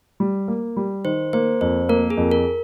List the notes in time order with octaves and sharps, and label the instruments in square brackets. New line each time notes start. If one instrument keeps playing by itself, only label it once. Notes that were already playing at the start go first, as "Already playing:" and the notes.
[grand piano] G3
A#3
G3
[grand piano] D#3 [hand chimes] C5
[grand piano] A#3 [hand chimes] C5
[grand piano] F2 [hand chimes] C5
[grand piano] A#3 [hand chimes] A#4
[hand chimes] G#4
[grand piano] F2
[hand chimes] A#4